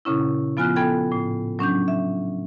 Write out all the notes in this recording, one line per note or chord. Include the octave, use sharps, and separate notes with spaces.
A#2 C#3 C#4 E4
F3 B3 F4 G#5 F6 F#6
B3 A4 G5 G#6
A2
F#3 C#4 D4 G6
E5